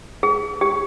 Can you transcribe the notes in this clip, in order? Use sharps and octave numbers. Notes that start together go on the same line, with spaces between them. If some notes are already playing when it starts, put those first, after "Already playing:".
G#4
G4